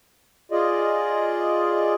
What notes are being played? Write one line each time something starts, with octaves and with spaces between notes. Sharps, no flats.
F4 G#4 D5 D#5